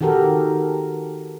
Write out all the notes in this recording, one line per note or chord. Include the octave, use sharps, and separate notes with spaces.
D#3 F#4 G4 A4 A#4